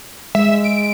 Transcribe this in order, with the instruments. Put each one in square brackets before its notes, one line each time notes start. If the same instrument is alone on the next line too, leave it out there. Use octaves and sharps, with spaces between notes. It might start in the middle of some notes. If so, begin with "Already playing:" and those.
[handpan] G#3 [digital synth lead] E5
[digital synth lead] D7